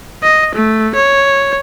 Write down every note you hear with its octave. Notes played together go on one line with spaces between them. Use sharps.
D#5
A3
C#5